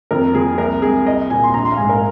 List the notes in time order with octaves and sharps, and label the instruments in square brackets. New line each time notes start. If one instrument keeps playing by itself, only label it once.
[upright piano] F2 A#4
F3 A#3 G#4
C2 A#4
C3 G#3 G#4
C2 D#5
A#2 A#3 G#5
C6
A#1 A#5
C6
F5
G#2 G#3 G#5
A#4